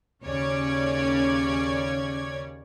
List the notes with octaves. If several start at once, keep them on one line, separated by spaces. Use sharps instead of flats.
D#2 C#3 C#4 C#5 D5 G#6